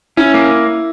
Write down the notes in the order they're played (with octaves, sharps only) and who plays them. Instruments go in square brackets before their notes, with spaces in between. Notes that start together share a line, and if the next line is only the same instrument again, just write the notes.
[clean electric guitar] C#4 [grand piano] E4
[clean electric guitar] A#3